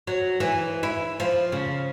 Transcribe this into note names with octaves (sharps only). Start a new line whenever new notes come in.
F#3
E3
E4
F3
C#3